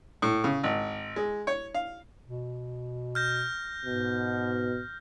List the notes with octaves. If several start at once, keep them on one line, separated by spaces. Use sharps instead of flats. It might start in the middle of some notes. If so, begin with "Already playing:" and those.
A2
C#3
G#1
G#3
C#5
F5
B2
F6 G6 A#6
G#2 B2